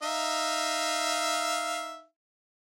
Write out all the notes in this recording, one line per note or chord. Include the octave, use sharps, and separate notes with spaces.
D#4 E5 F5